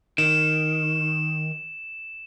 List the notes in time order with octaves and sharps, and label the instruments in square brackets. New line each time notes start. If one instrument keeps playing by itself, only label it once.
[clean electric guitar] D#3 [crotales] E7